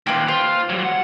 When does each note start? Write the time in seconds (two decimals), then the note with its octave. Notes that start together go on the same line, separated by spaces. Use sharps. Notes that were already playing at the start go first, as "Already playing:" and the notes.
0.07 D#2 F4 G4 B4
0.28 F4 C5
0.69 F#3 G3
0.84 F#5